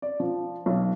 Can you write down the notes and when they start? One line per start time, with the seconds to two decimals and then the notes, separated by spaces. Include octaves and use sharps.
0.02 D5
0.20 F3
0.66 B1